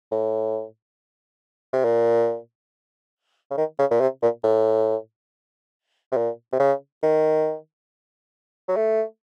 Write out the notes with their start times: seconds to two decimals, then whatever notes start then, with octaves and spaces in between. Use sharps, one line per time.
0.11 A2
1.73 C3
1.84 A#2
3.51 C#3
3.57 D#3
3.79 C#3
3.90 A#2
4.00 C3
4.22 A#2
4.44 A2
6.11 C3
6.17 A#2
6.52 C3
6.60 C#3
7.03 D#3
8.68 F#3
8.76 A3